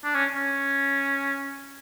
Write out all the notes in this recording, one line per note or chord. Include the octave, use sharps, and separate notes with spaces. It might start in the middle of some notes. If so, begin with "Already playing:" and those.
D4
C#4
C#4